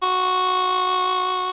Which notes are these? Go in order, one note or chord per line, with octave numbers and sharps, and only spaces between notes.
F#4